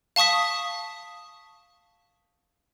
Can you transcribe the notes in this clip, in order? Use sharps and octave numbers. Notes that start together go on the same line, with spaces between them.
F5 A5 C#6 D#6 B6